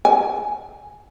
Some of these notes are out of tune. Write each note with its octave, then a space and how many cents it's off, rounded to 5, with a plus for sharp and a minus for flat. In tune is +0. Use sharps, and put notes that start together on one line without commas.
G#5 +0